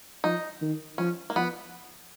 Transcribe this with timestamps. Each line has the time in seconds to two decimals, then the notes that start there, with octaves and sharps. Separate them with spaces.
0.24 F3 D#4
0.61 D#3
0.98 F3 C#4
1.30 A#3
1.35 F3 B3